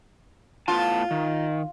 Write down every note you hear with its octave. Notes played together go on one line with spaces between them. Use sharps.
A2 B3 F4 A5
D#3